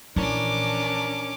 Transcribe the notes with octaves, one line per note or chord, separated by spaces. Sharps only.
A#1 E3 C#4 D4 E4 A#4 D6